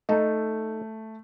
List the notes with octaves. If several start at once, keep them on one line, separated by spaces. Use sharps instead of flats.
A3 D#4 A4